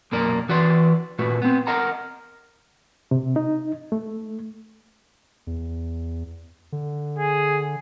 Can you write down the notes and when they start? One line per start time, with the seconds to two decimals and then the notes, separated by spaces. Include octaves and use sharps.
0.12 B1 F#2 A#3 A#4 D5
0.49 E3 F#4 B4 D5 C6
1.19 A#2 A3 F#4 B4
1.42 B3 C4
1.67 A#4 D#5 F#5 A#5
3.11 C3
3.36 D#4
3.92 A3
5.47 E2
6.72 D3
7.19 G#4